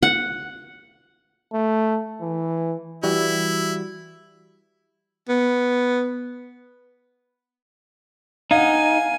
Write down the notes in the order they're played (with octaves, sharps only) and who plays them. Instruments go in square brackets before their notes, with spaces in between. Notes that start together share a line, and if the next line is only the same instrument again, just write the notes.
[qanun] F#5
[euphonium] A3
E3
[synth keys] E3 G3 F#4 [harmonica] E4
[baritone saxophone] B3
[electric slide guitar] D#4 [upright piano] F5 F#5 [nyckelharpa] G#5